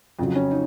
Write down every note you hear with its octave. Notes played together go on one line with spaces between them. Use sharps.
F2 C#3 F#3
C#4
D#4